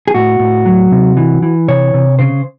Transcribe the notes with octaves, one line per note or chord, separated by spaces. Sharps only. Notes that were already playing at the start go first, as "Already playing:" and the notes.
G#4
A2 F#4
A2
F#3
C3
E3
E3
C3 C#5
C3
C#3 C5